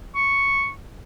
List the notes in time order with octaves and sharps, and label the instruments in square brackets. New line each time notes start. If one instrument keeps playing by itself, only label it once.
[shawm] C#6